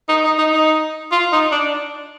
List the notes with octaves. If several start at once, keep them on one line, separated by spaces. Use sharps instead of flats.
D#4
D#4
D#4
D#4
F4
D#4
D4